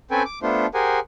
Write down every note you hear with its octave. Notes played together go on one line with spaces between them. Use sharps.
C4 C#4 A4 B4 G5 G#5
D6
A3 B3 D4 F4 C5
G4 G#4 A#4 C5 F#5 G#5